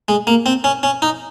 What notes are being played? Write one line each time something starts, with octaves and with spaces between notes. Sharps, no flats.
G#3
A#3
C4
C#4
C#4
D#4